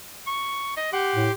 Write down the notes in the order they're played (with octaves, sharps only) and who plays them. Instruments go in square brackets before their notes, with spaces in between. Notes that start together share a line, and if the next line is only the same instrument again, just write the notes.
[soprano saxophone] C#6
D#5
[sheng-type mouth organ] G4 C6 D6 [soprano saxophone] F#5
[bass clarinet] A2